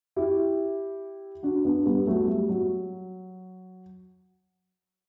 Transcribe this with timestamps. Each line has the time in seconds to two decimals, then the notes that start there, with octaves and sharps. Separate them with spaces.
0.16 E4 G4
1.43 D4 F#4
1.65 B3 D4
1.86 G3 B3
2.07 F#3 A3
2.27 G3
2.49 F#3